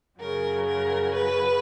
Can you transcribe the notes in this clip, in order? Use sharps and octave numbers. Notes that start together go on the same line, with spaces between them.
F#2 C#3 F#3 A#4
A#4
B4